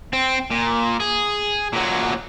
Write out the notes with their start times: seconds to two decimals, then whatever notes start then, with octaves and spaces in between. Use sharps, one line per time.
0.13 C4
0.51 A#2
1.00 G#4
1.73 A#2 F#3